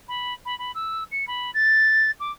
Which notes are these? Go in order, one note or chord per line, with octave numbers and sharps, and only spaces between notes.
B5
B5
B5
E6
C#7
B5
A6
D6